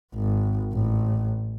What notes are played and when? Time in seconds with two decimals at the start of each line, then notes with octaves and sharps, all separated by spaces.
0.15 G#1
0.73 A1